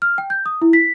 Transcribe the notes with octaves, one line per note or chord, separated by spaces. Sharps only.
F6
G5
G6
D#6
E4
B6